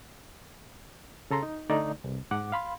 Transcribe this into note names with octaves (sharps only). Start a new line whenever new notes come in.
C#3 A4 A#5 C6
D#4
D3 A3 D#4 D5
C2
G#2 F#5 D6
F5 B5 C6